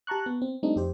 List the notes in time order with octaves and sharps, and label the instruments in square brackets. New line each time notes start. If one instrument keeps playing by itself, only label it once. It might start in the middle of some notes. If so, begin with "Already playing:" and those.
[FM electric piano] G4 A5 A#5 C#6 F#6
B3
C4
G3 A3 C4 D4 D#4
F2 G4 C5